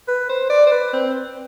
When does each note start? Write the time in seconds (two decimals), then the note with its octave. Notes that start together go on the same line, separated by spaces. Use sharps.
0.08 B4
0.29 C5
0.50 D5
0.67 C5
0.72 B4
0.93 C4